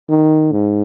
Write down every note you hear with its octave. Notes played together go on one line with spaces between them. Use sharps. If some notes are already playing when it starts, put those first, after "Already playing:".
D#3
G#2